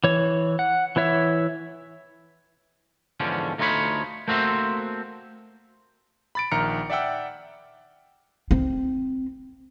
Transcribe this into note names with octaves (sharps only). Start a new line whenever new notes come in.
E3 C#5
F#5
E3 E4 C#5 E5
E2 G#2 D3 F3 C#4
D2 A3 D#4 F4 C#5 B5
A3 A#3 C4 F#4 C5 E5
B5 A6 D7
A#1 D#3 A#5 F6 C#7
D5 E5 F#5 G5 E6
C4